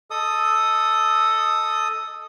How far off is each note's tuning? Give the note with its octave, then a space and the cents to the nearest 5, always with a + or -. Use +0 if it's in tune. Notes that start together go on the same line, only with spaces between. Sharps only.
A4 +0 D#5 +0 D#6 +0